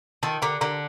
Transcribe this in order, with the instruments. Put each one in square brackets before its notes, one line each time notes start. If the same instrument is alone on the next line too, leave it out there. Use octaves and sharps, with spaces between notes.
[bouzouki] D#3 [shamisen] F4 A4
[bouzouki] D3 [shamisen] G4 A#4
[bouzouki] D3 [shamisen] G4 A#4